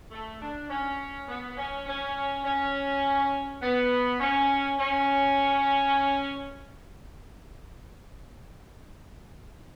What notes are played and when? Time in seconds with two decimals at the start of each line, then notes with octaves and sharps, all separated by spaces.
0.11 A3
0.41 D4
0.69 C#4
1.28 B3
1.57 C#4
1.86 C#4
2.45 C#4
3.62 B3
4.20 C#4
4.79 C#4